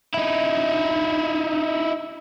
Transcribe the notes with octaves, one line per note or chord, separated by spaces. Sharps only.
D#4 E4